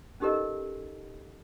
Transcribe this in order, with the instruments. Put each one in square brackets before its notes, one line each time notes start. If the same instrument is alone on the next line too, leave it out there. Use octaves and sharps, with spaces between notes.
[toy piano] C#4 D#4 G4 A4 A#4 D#5